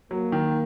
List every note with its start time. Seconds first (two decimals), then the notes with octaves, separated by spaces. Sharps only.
0.11 F#3 A#3
0.32 D#3